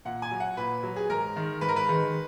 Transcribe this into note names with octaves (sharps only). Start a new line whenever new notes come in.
A#2 F#5
G#5
F#3
F#5
A#2 B4
F#3
G#4
G#2 A#4
D#3 G#3
G#2 B4
A#4
B4
D#3 G#3